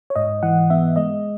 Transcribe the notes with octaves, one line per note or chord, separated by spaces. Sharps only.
C#5
G#2 D#5
E3 F#5
B3 E5
G#3 D#5